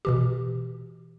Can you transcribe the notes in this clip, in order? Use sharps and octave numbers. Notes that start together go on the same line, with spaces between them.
B2 E3 G4